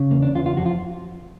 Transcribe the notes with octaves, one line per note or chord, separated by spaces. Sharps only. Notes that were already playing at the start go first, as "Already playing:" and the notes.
Already playing: C#3
E2 A#3
D4
E2 F4
F4
F2 F#4
F4